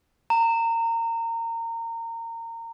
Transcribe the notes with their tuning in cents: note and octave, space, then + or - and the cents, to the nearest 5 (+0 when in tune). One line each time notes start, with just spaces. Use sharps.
A#5 -25